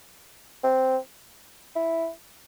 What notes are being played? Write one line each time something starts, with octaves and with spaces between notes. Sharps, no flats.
C4
E4